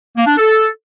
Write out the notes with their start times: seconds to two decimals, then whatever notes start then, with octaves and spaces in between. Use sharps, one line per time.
0.16 A#3
0.27 D4
0.37 A4